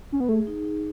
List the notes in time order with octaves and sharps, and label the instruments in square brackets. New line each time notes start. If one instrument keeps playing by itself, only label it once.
[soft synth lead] C#4
B3
[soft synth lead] A3 [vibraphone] G#4
[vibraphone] D#4
D#4